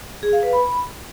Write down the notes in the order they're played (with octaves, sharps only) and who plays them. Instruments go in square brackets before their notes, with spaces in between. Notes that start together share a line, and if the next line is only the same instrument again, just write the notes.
[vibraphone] G#4
F5
B4
B5